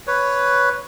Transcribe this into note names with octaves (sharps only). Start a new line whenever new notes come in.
B4 C#5